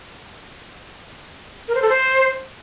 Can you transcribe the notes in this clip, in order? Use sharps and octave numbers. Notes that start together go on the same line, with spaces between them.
A#4
C5
A4
C5